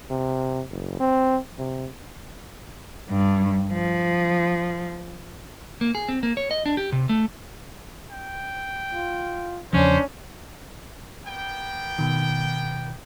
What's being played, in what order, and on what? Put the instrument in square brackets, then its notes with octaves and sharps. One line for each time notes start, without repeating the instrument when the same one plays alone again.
[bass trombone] C3
F#1
C4
C3
[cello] G2
F3
[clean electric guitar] A#3
G#4
C4
A#3
C#5
D#5
D4
G4
C3
A3
[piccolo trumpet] G5
[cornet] F4
[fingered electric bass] E2 C#3 F3 [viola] C#4 [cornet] D4 [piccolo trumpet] C5
[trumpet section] A#3 B3 G5
[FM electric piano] B2 D#3